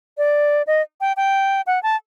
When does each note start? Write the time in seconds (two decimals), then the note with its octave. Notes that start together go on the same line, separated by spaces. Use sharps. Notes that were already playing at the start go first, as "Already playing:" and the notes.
0.18 D5
0.67 D#5
1.01 G5
1.17 G5
1.67 F#5
1.83 A5